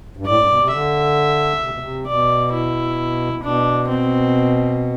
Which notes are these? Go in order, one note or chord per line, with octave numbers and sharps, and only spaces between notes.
G2
A2 D5
G2
B2
C3
D3 E5
C3
B2
C3
B2 D5
E4
B2 D4
C4